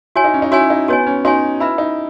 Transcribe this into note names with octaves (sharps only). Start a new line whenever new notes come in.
E4 F#4 C#5 G#5
D#4
C#4
D#4
E4 F#4 C#5 G#5
D#4
B3 F#4 C#5 G#5
C#4
D#4 F#4 C#5 G#5
E4 B4 E5 B5
D#4